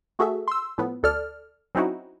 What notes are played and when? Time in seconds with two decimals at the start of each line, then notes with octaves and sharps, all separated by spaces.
0.19 A3 F#4 G#4 A4 E5
0.48 C6 E6
0.78 A2 F3 B3
1.03 D2 A4 D5 F6
1.75 F#3 C4 C#4 D#4 E4 F#4